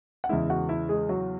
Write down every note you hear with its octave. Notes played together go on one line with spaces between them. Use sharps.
F#5
E2 C#3 E3 G#3 E4 E5
F#4 F#5
E4 E5
G#3 G#4
F#3 F#4